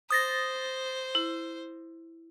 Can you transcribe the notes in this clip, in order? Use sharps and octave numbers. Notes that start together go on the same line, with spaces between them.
C5 D#6 A6 A#6
E4